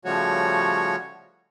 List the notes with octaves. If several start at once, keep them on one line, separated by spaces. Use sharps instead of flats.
C#3 F3 G3 A3 F#4 C#5